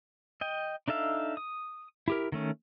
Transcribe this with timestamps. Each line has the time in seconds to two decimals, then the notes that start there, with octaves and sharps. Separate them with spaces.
0.41 D#5 G5
0.88 D4 D#4 A4 E5 F5
1.37 D#6
2.08 E4 G4 A#4
2.32 D#3 A3 C#4